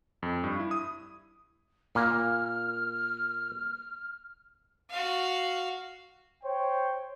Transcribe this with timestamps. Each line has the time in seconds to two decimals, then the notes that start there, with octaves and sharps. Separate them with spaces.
0.23 F2
0.44 G2
0.60 E4
0.71 D#6
1.95 A#2 A#3 F6
4.90 F#4 F5
6.43 C5 C#5 G5